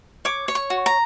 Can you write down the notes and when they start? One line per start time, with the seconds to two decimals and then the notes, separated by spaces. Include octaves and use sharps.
0.25 C#5 D6
0.48 C#5
0.55 C#6
0.70 F#4
0.86 A#5